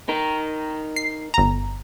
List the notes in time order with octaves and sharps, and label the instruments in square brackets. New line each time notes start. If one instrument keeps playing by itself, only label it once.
[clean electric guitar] D#4 A#4
[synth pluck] C7
G1 A#5